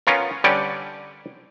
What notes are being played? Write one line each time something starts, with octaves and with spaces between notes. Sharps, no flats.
B3 C#4 F4 A#4
D3 G3 C#4 B4 D5 G5